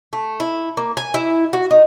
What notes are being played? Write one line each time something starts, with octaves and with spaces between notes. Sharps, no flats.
A3
E4
A#3
G#5
E4
F#4
D#4